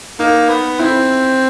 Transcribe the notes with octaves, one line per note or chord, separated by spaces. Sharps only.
A#3 D#4
B3
C4 E4